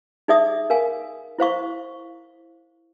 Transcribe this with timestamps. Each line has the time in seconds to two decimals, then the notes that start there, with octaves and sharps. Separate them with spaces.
0.28 D#4 G#4 D5 E5 D#6
0.70 A#4 F5 G#5
1.38 E4 C5 F5 C#6